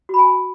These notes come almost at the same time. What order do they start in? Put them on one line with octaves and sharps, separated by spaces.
F#4 B5 G#5